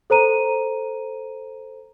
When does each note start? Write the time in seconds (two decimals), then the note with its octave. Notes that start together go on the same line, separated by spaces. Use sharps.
0.10 A4 C5 A#5 D#7